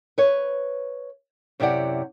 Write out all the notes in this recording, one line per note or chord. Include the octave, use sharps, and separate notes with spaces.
B4 C#5
F#2 C3 E4 G4 D5 F#5